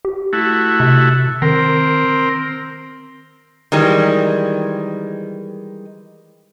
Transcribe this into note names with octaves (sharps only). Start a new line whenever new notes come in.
G4
A3 E4 F#4
C3
D#3 C4 A#4
D#3 E3 G3 G#3